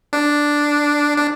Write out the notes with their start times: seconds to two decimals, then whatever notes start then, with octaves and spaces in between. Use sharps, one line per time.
0.13 D4
1.18 D4